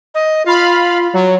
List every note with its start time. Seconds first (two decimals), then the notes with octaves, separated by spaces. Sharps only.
0.15 D#5
0.46 F4 F5 B5
1.13 F#3